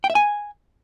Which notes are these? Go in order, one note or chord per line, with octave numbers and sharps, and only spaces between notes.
G5
E5
G#5